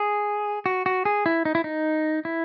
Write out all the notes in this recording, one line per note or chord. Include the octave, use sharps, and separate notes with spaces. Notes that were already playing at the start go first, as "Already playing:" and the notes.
Already playing: G#4
F#4
F#4
G#4
E4
D#4
E4
D#4
E4